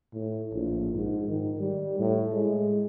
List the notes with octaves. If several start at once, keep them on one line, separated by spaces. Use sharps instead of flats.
A2
A#1
G#2
D#3
G3
A2
G#3